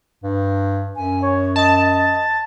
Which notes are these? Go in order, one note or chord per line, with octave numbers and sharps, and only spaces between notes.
G2
F#2 G#5
C#5
D#5 A5